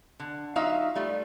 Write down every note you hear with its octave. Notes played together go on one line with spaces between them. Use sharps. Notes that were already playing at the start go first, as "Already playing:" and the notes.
D3
F#3 D#4 F4 E5 F5
G3 A3 F4